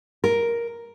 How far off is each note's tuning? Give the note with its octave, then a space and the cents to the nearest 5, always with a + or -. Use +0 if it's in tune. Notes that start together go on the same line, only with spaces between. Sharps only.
A#4 +5